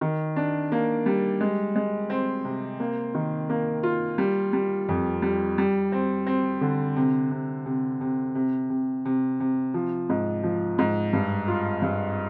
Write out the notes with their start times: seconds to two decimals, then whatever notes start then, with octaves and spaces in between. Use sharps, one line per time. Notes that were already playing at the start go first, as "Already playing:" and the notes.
0.01 D#3
0.36 D4
0.72 A#3
1.06 G3
1.41 G#3
1.76 G#3
2.10 C4
2.45 C3
2.80 A#3
3.15 D#3
3.50 A#3
3.83 F4
4.18 G3
4.53 G3
4.88 F2
5.22 G3
5.58 G3
5.92 C4
6.27 C4
6.61 D3
6.96 C3
7.31 C3
7.66 C3
8.01 C3
8.35 C3
8.70 C3
9.05 C3
9.40 C3
9.74 F3
10.09 G#2
10.43 F3
10.79 G#2
11.13 G2
11.48 F4
11.82 G2